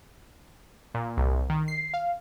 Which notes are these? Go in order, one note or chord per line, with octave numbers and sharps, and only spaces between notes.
A#2
C2
D#3
C7
F5